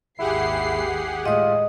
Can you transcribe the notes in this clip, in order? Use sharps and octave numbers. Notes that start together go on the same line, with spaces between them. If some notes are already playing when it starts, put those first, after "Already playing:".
G#1 D#2 E4 G4 G#4 F#5 C7
A2 G#3 F4 D#5 D#6